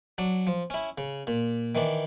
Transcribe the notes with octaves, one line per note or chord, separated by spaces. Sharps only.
F#3 D4
F3
C#4 E4
C#3
A#2
D#3 E3 D4